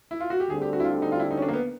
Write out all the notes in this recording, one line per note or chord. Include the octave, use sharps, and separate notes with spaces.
E4
F4
F#4
G4
D2 D3 G3 C4 G#4
G4
F#4
E4
F4
D#4
F4
E4
D#4
C#4
D4
A#3
B3